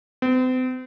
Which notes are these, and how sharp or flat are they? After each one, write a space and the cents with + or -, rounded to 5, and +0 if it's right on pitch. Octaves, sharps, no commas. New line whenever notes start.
C4 -40